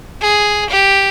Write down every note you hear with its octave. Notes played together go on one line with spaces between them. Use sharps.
G#4
G4